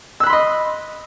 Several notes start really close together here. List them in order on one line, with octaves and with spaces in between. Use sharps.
E6 F#6 B5 C6 D#5